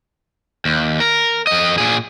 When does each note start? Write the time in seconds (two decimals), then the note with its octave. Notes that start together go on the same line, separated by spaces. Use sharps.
0.65 D#2
1.00 A#4
1.47 F2 D#5
1.78 A#2 G#4